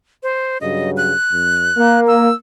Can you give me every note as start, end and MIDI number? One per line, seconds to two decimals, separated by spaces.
0.23 0.58 72
0.61 1.13 43
0.61 1.13 49
0.61 1.13 54
0.61 0.90 75
0.97 2.00 90
1.31 1.71 41
1.75 2.30 58
2.08 2.34 88